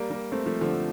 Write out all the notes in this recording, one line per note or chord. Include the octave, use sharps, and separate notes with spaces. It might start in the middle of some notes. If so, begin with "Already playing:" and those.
Already playing: G3 A#3
G3 A#3
A3 C4
F3 A3
D3 F3